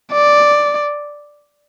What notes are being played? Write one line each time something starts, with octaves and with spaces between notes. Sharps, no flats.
D5